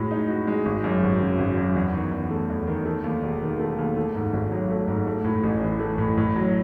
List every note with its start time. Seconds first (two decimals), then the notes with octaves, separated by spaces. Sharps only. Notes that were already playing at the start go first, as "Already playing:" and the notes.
Already playing: A2 G#3 F#4
0.11 D#4
0.28 F#4
0.47 G#3
0.65 G#1
0.84 F#2
1.02 G#1
1.20 C#3
1.38 G#1
1.57 F#2
1.76 E2
1.94 D#3
2.12 E2
2.31 A3
2.50 E2
2.67 D#3
2.85 A3
3.04 D#2
3.23 E1
3.41 D#3
3.60 A3
3.78 D#2
3.97 A3
4.15 G#2
4.33 G#1
4.52 F#3
4.70 A3
4.88 G#2
5.07 A3
5.24 A2
5.43 A1
5.62 E3
5.79 A3
5.98 A2
6.17 A2
6.36 F#3